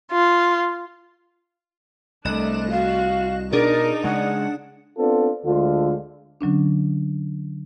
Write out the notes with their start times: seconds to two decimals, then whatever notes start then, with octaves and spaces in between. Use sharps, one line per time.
0.11 F4
2.25 C2 A3 D4 D#5 F#6 E7
2.71 F#4 F5
3.53 B2 D4 D#4 G#4 A#4 D5
4.04 C#3 G#3 F#5
4.97 B3 C4 D4 F4 A4
5.45 D2 D3 G#3 F4
6.41 D3 F#3 C#4 D4